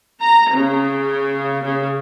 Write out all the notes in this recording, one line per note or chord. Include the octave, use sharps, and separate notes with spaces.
A#5
C#3
C#3